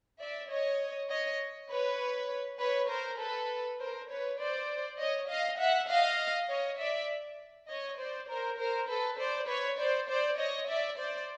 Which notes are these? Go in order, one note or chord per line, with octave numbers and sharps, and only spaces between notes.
D5 E5
C#5 D#5
C#5 D#5
B4 C#5
B4 C#5
A#4 C5
A4 B4
A#4 C5
B4 C#5
C5 D5
C#5 D#5
D#5 F5
E5 F#5
D#5 F5
C#5 D#5
D5 E5
C#5 D#5
C5 D5
A#4 C5
A#4 C5
A4 B4
C5 D5
B4 C#5
C5 D5
C5 D5
C#5 D#5
D5 E5
C5 D5